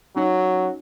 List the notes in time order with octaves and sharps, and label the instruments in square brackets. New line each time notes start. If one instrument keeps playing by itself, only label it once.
[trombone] F#3 [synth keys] C#4 D#4 F#4